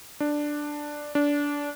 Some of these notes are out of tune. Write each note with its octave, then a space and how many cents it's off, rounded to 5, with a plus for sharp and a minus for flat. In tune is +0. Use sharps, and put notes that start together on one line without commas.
D4 +5
D4 -20